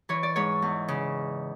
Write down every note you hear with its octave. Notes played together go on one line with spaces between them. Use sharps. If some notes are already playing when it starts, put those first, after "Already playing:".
E3 C#5
D5
G#2 C#5
E2
C#3